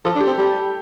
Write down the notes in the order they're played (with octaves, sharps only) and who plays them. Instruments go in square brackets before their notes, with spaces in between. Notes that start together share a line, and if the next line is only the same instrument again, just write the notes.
[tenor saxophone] F3 [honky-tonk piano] A4
[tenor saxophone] D4
[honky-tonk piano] G4
[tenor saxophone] C4
G3